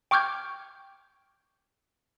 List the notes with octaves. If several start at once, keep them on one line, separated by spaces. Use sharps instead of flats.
G5 C#6 D6 F6 G6 G#6